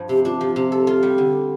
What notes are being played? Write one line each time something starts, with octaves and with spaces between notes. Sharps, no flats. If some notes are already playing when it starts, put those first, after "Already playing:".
Already playing: G2 F3
C3 G4
D4 F4
F3 G4
C3 G4
G4 A4
F4
G3
D3